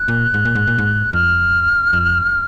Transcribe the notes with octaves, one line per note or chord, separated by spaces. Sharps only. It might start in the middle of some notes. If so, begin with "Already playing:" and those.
Already playing: F#6
A#2
G#2
A#2
G#2
A#2
G#2
F2 F6
F2